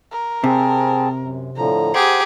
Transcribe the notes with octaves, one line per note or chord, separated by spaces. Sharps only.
A#4
C3 C4 G#4 A5
F#2
A2 D3 F3 A#5
G4 G#4 C5 F#5